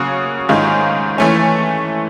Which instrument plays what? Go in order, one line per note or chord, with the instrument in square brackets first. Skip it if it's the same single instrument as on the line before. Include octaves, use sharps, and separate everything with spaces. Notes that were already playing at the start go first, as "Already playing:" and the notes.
Already playing: [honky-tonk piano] C#3 F#3 A#3 C#4 F#4
G#2 D#3 G#3 C#4 F4
E3 A3 C#4